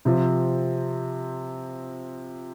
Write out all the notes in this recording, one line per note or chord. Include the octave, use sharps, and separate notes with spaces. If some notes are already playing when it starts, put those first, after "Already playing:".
C3 F3 C4